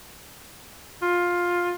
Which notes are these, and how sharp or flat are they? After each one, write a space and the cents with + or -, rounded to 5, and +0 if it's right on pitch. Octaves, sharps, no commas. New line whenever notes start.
F4 +10